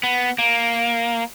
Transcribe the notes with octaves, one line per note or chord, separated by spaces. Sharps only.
B3
A#3